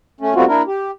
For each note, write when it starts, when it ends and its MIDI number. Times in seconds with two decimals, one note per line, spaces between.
0.21 0.34 57
0.21 0.34 61
0.35 0.45 55
0.35 0.45 57
0.35 0.45 59
0.35 0.45 60
0.35 0.45 65
0.35 0.45 66
0.48 0.62 58
0.48 0.62 62
0.48 0.62 64
0.48 0.62 70
0.67 0.91 67